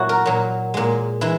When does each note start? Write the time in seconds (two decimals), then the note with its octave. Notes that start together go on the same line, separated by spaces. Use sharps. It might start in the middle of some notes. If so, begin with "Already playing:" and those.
Already playing: A#2 F#3 E4 F#4
0.09 A#4
0.26 A#2 F#3
0.74 A#2 G#3
1.21 E3 G#3 E4